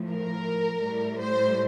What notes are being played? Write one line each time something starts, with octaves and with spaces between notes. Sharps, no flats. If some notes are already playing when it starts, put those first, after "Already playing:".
Already playing: A2 F3
A#4
A2 G3
C5